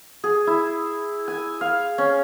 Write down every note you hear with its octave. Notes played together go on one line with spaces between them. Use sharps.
G#4
E4
G#5
F5
C#4